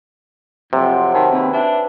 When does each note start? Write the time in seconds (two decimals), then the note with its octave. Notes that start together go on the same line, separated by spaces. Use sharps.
0.73 F2 C3 F#3 C4
1.14 D#3 E4 G#5 A5
1.32 D#2 C4 B4
1.53 D4 E5